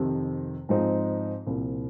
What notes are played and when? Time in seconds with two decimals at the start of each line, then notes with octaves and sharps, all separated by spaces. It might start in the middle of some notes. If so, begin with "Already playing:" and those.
Already playing: F2 C3 D#3
0.69 G#2 F3 G#3 C4 D#4
1.46 C2 A#2 F3 C4